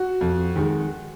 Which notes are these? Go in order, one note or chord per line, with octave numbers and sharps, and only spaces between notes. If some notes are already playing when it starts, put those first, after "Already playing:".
Already playing: F#4
F2
D#3 G#3